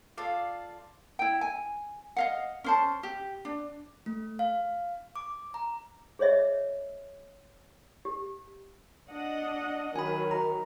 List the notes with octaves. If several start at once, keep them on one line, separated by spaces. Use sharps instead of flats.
F4 A4 D5 F5
E4 G5
G#5
D#5 F5 F#5
C#4 C5 A5
G4
D4
A3
F5
D6
A#5
G#4 C5 C#5 D#5 E5
G4
D4 D#5 F#5
D#3 F#3 G#5 B5
A#5